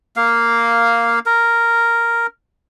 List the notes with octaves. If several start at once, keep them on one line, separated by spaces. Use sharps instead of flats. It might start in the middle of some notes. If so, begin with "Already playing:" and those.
A#3 F5
A#4